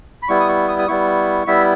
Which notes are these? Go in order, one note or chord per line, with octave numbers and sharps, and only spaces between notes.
B5
G3 B3 E4 C#6
D#6
C#6
D#6
D#6
G3 B3 E4 C#6
G3 B3 E4 E5